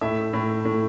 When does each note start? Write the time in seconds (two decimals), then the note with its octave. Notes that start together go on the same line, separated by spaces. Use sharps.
0.01 A2 E5
0.33 A2
0.65 A2